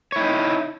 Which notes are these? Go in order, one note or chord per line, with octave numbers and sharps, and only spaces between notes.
D#4 E4 C#5